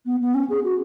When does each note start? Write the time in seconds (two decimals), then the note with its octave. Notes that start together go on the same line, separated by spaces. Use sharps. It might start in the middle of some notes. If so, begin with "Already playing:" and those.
0.06 B3
0.21 B3
0.34 C#4
0.50 G#4
0.64 F#4